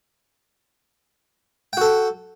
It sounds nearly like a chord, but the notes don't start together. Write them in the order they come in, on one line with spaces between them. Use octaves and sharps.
G5 F#4 A4